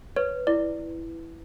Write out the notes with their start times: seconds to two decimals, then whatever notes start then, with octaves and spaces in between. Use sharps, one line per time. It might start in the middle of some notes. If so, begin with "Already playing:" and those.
0.16 B4 C#5
0.47 E4 D5